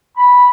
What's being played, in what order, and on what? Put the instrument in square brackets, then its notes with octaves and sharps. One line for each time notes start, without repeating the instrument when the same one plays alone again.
[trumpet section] B5